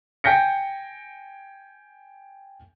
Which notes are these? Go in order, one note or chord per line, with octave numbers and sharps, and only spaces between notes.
G5 G#5 G6 A#6 C#7